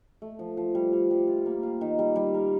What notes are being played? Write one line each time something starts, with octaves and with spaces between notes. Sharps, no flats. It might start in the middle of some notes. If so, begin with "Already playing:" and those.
A3
F3
F3
G3
G3
G3
F4
A#3
F4
D#3
G3
G3
A#4